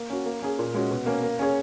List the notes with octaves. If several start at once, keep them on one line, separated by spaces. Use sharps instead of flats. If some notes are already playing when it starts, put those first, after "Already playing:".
Already playing: A#3
C#4 F#4
A#3
C#4 G#4
A#2
G#3 C#4 F#4
B2
A#3 C#4
A#3
C#4 G#4 C#5